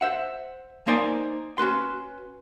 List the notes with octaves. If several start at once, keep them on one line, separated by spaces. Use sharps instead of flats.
C5 E5 F#5
A#3 D#4 C5 D5 G#5
C#4 F#4 B4 C6